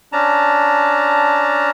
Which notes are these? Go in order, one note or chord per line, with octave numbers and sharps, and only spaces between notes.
C#4 D4 A5 A#5